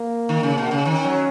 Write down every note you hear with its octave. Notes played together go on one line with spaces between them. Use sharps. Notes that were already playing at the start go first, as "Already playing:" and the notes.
Already playing: A#3
D#3
C#3
B2
C#3
D#3 C#4
F#3